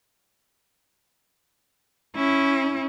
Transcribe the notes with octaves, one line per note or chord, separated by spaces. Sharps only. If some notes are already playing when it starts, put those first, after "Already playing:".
C#4 E4